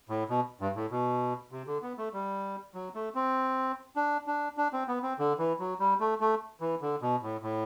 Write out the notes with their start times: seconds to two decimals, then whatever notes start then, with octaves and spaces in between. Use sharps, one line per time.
0.09 A2
0.30 B2
0.61 G2
0.75 A2
0.91 B2
1.52 C3
1.67 D3
1.82 B3
1.98 A3
2.13 G3
2.74 F#3
2.95 A3
3.15 C4
3.96 D4
4.27 D4
4.57 D4
4.73 C4
4.88 B3
5.03 C4
5.19 D3
5.38 E3
5.60 F#3
5.80 G3
6.00 A3
6.20 A3
6.61 E3
6.81 D3
7.02 B2
7.22 A2
7.43 A2